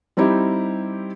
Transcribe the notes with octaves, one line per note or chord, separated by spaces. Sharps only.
G3 C4 D#4 E4 G4